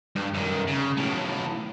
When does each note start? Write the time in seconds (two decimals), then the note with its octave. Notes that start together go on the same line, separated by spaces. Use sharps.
0.16 G2
0.34 F#2 D#3
0.68 C#3
0.97 B1 A2